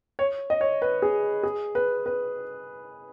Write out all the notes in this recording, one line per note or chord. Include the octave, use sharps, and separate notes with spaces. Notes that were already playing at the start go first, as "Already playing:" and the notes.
C#5
D#5
C#5
B4
G#4
G#4
B4
B4